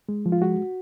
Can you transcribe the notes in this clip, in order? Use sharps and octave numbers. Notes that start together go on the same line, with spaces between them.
G#3
F3
F4
G#3 F#4